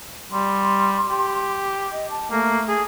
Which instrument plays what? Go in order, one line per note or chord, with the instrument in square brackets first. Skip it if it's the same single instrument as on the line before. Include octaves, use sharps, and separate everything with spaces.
[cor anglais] G3 [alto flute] C6
[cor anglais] G4
[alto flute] D#5
A5
[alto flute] A3 [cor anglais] A#3
[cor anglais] G#4